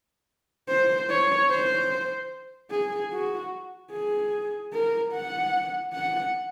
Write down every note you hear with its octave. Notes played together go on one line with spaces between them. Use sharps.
C5
C#5
C5
G#4
F#4
G#4
A#4
F#5
F#5